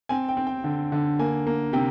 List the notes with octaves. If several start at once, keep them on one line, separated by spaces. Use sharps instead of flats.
C4 G#5
G5
C4
G5
D3
D3
A#3 G#5
A#3
C3 G5